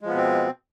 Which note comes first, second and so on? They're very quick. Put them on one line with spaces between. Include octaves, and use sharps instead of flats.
G#3 F3 B3 B2 C4